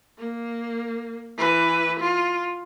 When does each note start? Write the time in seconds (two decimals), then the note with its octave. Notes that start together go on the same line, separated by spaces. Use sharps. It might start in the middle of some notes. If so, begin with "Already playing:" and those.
0.19 A#3
1.37 E3 B4
2.00 F4